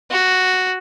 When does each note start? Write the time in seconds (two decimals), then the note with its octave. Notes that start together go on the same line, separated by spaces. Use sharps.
0.10 F#4